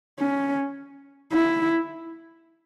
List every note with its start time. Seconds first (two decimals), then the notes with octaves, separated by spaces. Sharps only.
0.19 C#4
1.33 E4